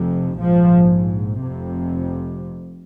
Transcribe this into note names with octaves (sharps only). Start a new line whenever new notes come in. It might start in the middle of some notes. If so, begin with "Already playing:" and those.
Already playing: F1 F2 C3
A#1 G#2 F3
F1 F2 C3